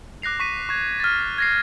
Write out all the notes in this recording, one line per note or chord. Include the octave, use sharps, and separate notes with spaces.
D6 F#6 A#6 C7 F7
C#6 B6 D#7
C#6 G#6
F6 A6
G#6 A#6 C7